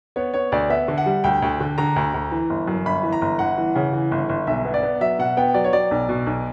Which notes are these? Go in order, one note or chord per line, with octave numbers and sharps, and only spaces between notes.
B3 C#5
B3 C#5
D2 D5
B3 E5
D3
F#5
G3
D2 G5
D2
D3
D3 A#5
D2
D2
E3
G1
F#2
G1 B5
E3
A#5
G1
G1 F#5
E3
C#3
E3
G1
G1
B1 E5
B3
D5
B3
F#3 E5
B2 F#5
B3 G5
F#3 D5
C#5
F#3 D5
B1
B2
B1